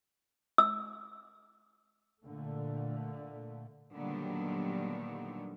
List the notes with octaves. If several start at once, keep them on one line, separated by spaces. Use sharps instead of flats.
E6
A#2 D3 A3
A#2 D3 D#3 F#3 G3 B3